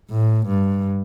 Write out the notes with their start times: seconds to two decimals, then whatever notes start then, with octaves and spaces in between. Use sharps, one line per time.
0.11 A2
0.47 G2